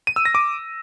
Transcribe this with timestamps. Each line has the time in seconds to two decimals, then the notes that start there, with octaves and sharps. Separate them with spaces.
0.07 D#7
0.16 E6
0.25 A#6
0.35 D6